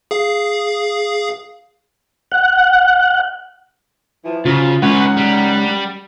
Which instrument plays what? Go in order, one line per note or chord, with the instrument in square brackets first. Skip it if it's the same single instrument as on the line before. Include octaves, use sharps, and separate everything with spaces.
[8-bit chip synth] G#4 F5
[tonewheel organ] F#5
[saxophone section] E3 F3
[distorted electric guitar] C#3 [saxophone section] F#3 A#4 C5 [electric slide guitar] F4
[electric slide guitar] G#3 C#4 [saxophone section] D#4 A#4 F#5 [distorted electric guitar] B4 C#5
[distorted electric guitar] G3